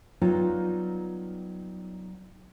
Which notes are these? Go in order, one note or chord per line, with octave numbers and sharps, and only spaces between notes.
F#3 G3 B3 D#4 F4